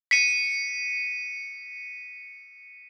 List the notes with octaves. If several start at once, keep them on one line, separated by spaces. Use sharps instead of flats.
B6 C#7 D#7